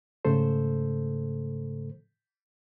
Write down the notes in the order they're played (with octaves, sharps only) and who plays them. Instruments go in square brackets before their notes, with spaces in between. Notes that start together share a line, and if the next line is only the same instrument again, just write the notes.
[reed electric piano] G#2 C#3 A3 A4 C5